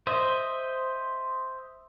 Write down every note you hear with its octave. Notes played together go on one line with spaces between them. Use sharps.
C5 D#5 E5